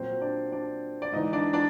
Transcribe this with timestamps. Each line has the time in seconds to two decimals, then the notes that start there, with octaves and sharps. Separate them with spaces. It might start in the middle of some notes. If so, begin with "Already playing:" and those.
Already playing: A#2 F#3 C4 C5
0.21 D4 D5
0.52 D4 D5
1.02 D5
1.12 G#2 E3 D#4 D#5
1.33 D4 D5
1.53 D4 D5